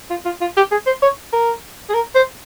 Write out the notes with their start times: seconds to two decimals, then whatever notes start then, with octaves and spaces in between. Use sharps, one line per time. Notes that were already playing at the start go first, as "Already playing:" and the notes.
0.10 F4
0.25 F4
0.41 F4
0.57 G4
0.72 G#4
0.87 C5
1.02 C#5
1.33 A#4
1.90 G#4
1.94 A#4
2.15 C5